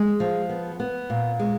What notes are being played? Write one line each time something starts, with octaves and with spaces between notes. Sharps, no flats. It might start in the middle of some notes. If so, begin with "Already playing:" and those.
Already playing: G#3
F3
B3
B3
A#2
G#3